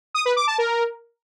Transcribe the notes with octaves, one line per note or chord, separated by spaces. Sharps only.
D#6
B4
D6
A5
A#4